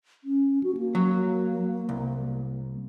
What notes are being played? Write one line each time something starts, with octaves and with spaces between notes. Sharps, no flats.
C#4
F#4
A#3
F#3
C2